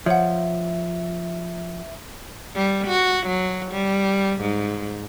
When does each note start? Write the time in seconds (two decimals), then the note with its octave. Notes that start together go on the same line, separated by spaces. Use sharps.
0.06 F3 C#5 E5 F#5
2.55 G3
2.87 F#4
3.27 F#3
3.72 G3
4.41 G#2